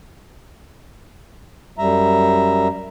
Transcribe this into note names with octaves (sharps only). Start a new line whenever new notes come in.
F#2 G3 E5 A#5